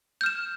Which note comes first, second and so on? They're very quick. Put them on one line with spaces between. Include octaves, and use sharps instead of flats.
G6 F6 E7